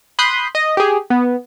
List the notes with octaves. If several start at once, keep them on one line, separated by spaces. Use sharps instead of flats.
B5 C6 D#6 F#6 G6
D#5
G4 G#4
B3